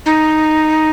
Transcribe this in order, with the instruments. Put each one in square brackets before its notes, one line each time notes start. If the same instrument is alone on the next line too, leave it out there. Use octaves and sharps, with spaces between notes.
[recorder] D#4